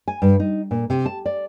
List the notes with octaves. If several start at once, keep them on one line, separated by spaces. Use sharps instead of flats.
G#5
G2
D#4
A#2
C3
A5
D5